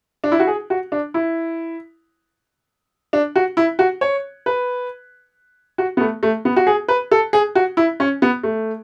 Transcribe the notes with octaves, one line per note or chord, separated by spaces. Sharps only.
D4
E4
F#4
G#4
F#4
D4
E4
D4
F#4
E4
F#4
C#5
B4
F#4
B3
A3
A3
B3
F#4
G#4
B4
A4
G#4
F#4
E4
C#4
B3
A3